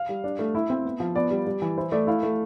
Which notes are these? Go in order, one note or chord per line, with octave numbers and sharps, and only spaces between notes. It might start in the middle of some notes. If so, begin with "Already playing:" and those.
Already playing: F5
G3
D4
A3
E4 E5
C4
B3
F3
B3 D5
G3
G3
E3
E4 C5
A3 D5
E4 F5
A3